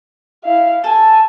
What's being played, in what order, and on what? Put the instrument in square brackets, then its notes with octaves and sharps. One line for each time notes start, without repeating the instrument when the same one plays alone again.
[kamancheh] E4 F5
[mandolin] A4 [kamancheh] G#5